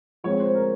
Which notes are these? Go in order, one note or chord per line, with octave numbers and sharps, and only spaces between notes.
F3 G#3 C4 C#5
C5
A#4